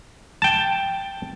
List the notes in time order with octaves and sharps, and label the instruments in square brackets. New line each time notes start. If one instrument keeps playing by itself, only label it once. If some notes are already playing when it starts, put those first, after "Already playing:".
[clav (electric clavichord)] G5 A5